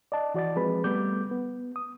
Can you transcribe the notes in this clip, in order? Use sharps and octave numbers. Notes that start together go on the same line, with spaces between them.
D5 D#5 A5
E3 F#4 D5 D#5 A6
F3 G#3 C4 G#4 B4 B5
G3 A3 B3 D6 G6
B3
D#6